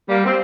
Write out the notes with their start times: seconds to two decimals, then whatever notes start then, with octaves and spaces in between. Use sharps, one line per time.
0.08 G3 A#3
0.25 C4